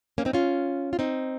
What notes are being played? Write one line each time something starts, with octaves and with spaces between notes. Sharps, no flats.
A#3 C#4
C4 D#4
C#4 F4
F4
C4 D#4